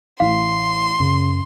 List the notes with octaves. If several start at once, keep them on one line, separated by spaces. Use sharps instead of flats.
A1 E3 F5 C6
F#2 C#3